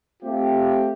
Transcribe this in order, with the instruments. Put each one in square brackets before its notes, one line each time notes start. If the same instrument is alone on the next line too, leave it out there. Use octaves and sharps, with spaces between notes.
[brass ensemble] A3 C4 F4 G4